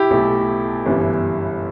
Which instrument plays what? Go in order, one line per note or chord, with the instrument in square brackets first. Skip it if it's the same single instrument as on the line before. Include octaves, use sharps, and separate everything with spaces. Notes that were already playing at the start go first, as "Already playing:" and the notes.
Already playing: [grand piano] E4 G4
[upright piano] B1 B2 A3
G1 F#2 E3 G3